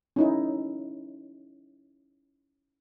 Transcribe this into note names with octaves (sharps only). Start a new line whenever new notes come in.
C#4 D#4 E4